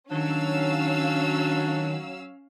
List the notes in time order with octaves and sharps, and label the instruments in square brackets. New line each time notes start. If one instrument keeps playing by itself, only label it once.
[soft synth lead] D#3 [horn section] F#3 [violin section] C#4 F5 E6 [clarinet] D4